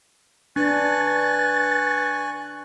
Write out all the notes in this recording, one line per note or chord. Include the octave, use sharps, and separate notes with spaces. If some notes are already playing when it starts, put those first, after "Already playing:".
D4 B4 G#5 C#6 F#6 A6